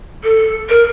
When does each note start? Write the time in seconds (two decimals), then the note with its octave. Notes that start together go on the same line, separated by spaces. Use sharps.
0.24 A4
0.69 A#4